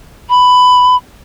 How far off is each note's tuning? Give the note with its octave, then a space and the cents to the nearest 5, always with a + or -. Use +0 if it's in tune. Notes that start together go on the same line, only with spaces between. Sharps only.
B5 +10